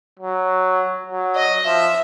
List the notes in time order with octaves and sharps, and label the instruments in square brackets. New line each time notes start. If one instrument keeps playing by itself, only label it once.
[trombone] F#3
F#3
[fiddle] D#5
[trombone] F3 [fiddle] E5